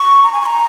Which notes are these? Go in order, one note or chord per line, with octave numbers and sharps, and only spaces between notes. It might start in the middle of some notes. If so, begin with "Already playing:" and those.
Already playing: C#6
A#5
G#5
C#6
A#5